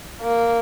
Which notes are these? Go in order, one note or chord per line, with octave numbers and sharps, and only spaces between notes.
A#3